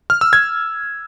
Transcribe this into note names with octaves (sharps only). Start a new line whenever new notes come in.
F6
E6
G#6